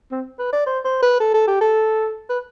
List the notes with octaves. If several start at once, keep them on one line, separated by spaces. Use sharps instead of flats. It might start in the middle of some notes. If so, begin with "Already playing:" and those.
C4
B4
D5
C5
C5
B4
A4
A4
G4
A4
B4